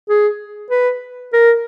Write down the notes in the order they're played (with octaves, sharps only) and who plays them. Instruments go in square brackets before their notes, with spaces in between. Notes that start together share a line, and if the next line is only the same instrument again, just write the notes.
[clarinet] G#4
B4
A#4